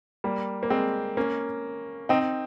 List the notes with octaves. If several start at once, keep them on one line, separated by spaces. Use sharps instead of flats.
G3 A#3
A#3
G#3 C4
A#3 C#4
C4 D#4